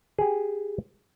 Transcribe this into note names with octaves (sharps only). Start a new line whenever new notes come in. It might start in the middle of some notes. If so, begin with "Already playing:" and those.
G4 G#4